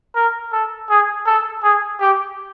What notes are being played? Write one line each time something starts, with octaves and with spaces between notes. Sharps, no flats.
A#4
A4
G#4
A4
G#4
G4